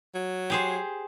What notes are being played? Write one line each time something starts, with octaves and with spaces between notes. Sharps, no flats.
F#3
G4 G#4 C5